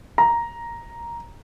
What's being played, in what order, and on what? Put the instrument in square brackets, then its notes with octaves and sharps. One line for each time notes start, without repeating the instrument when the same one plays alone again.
[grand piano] A#5